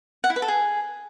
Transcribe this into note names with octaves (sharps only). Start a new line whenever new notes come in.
F#5
E4
B4
A4
G#4